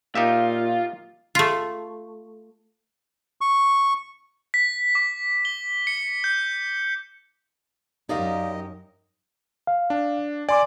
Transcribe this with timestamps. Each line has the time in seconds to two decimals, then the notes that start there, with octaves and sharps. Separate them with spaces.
0.15 A#2 D#4 F4 G4 E5 F5
1.35 A3 F4
3.41 C#6
4.54 B6
4.95 D6
5.45 G7
5.87 C#7
6.24 G6
8.09 F#2 D#4 G4 A#4 D5 D#5 F5
9.67 F5
9.90 D4
10.49 D5 G#5 C6 D6